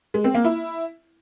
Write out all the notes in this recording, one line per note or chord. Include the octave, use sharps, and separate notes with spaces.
G#3
C4
A#3
E4